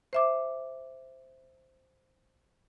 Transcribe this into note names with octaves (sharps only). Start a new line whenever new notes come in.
C5 E5 D6